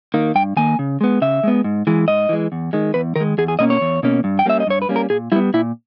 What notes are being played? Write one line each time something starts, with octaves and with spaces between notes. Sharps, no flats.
D#3 A#3
G2 G5
D#3 A#3 G#5
C#3
G#3 B3
C#3 E5
G#3 B3
G#2
E3 G#3
G#2 D#5
E3 G#3
E2
D#3 G#3
E2 B4
D#3 G#3 A#4
E2 G#4
G#4
B2 A#3 C#4 D#5
C#5
E2
B2 A#3 C#4
G2
G5
G3 A#3 C#4 E5
D#5
G2 C#5
B4
G3 A#3 C#4
A#4
A#2 G#4
G3 B3 E4
A#2 E4